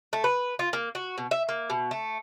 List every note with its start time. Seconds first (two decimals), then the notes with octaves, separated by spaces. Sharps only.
0.13 A3
0.24 B4
0.59 F4
0.73 A#3
0.95 F#4
1.18 B2
1.31 E5
1.49 A#3
1.70 B2
1.91 A3